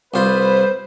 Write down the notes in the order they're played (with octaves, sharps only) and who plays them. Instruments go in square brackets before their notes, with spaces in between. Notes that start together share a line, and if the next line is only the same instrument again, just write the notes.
[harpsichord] C2 F4 [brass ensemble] B4 [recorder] C5